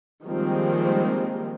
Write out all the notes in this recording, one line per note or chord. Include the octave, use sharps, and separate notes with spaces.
D#3 F3 G3 G#3 A#3 C4